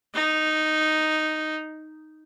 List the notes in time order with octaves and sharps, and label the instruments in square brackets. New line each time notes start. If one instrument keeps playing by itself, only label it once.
[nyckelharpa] D#4